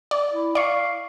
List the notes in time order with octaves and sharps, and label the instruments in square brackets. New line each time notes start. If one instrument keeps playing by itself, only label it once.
[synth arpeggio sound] D5
[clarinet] E4
[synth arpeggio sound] D5 C#6 [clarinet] F5